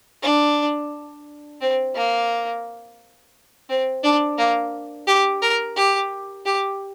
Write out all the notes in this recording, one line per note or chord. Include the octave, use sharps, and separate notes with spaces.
D4
C4
A#3
C4
D4
A#3
G4
A#4
G4
G4